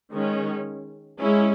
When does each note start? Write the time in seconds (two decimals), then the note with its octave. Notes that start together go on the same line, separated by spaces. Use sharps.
0.12 D#3 G#3 C#4
1.18 G#3 C#4 E4